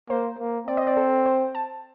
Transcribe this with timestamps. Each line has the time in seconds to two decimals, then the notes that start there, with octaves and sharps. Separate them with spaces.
0.09 A#3 C5
0.39 A#3
0.67 C4 D5
0.77 D#5
0.87 D5
0.97 A4
1.26 C5
1.55 A5